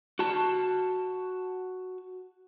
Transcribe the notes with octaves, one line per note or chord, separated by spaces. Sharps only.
F#4 A5